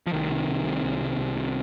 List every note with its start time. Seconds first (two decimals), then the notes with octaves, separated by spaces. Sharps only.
0.07 F3
0.13 C2 D#3
0.30 C3
0.48 C2
0.65 C3
0.83 C2
1.01 C3
1.18 C2
1.36 C3